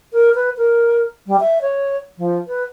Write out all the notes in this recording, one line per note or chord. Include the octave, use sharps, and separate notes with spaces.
A#4
B4
A#4
G3
E5
C#5
F3
B4